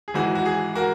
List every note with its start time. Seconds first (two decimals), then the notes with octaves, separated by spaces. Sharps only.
0.08 G#4
0.14 G#1 G#2 E3 G#3 F#4
0.35 F#4
0.46 G#4
0.75 F#4 A#4